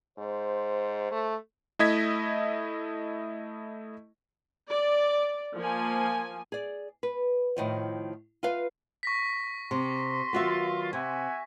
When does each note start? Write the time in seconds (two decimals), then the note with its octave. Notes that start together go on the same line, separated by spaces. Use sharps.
0.18 G#2 C5
1.11 A3
1.79 A3 E4 D#5 G#6 B6
4.70 D5
5.56 F3 A#3 G#5
6.52 G#4 D5
7.03 B4
7.57 A2 D#3 F3
8.43 F4 B4 F5
9.03 C#6 A#6 B6
9.71 C3 C6
10.33 D#3 F#3 B3 F4 F#4 E5
10.93 C3 E5 F#5 G#5